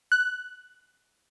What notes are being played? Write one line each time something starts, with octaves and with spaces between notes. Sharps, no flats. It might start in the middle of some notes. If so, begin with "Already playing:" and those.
F#6